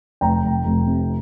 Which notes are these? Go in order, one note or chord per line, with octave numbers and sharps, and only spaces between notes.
F1 G5 A#5
F1
F1
C3